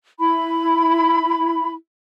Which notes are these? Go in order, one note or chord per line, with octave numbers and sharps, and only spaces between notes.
E4 B5